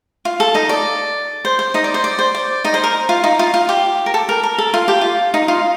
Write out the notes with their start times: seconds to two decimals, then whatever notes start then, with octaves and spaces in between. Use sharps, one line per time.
0.25 F4
0.40 A4
0.54 D#4 D#5
0.69 D5
1.45 C5
1.59 C5
1.74 D#4 D#5
1.84 D5
1.94 C5
2.04 D5
2.19 C5
2.34 D5
2.64 D#4 D#5
2.74 C5
2.84 A#4
3.09 F4
3.24 D#4
3.39 F4
3.54 F4
3.69 G4
4.06 A#4
4.14 A4
4.29 A#4
4.43 A#4
4.58 A4
4.74 F4
4.88 G4
5.01 F4
5.34 D#4
5.48 F4